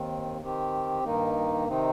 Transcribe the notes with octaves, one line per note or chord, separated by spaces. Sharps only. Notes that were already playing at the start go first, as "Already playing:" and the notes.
Already playing: D#2 D#3 C4
D#3 C4 G4
G2 D#3 A#3 D#4
C3 D#3 C4 D#4